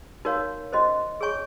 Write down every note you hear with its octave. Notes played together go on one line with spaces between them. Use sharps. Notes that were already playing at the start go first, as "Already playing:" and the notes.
D#4 F#4 A#4 C#5 F5
C#4 F#4 C5 D#5
G#4 C#5 G#5 C#6